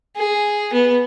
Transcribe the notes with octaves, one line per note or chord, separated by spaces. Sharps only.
G#4
B3